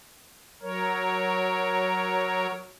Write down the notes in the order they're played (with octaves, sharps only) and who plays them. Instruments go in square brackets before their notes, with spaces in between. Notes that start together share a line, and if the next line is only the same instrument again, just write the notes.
[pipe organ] F#3 A#4 C#5